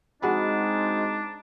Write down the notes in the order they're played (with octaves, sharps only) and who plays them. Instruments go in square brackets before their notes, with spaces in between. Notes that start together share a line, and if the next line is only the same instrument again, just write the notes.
[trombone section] G#3 C4 D#4 [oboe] D4 [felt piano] F#4 G#4 B5